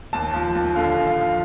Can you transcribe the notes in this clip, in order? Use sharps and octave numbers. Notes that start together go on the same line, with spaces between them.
D#2 A5
F3
D#2
D3 F5
D#2
F5
F3